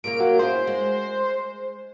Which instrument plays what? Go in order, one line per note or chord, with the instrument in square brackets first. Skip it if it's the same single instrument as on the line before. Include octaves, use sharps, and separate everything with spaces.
[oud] A#2 C#3 A#3 [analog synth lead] D7
[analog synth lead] F#3
[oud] C#4 E4 G#4 [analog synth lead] C5
[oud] G#3